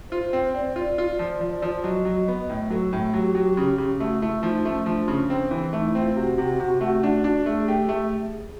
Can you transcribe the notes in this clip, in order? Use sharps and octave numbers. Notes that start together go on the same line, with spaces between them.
F4 C5
C4
C4 D5
F4 D5
F4
F3
F3
F3
F#3 D#5
F#3
B3
A2
F#3 A4
A2
F#3 G4
F#3
C#3
C#3
A3 F#4
A3 E4
F3 D#4
A3 C#4
F3 D4
C#3
C4
E3
A3 D#4
E4
C4
F4
C3 F#4
C3
C3
A3
D4
D4
A3 G#4
G#4
G4 A4
A3 G#4